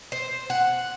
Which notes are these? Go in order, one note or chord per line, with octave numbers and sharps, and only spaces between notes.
C5
F#5